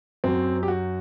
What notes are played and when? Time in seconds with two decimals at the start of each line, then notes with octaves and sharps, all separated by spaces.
0.24 F#2 F#3 C4
0.63 G4
0.68 F#4